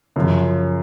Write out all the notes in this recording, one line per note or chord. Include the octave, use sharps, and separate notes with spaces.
F#2 C#3 F3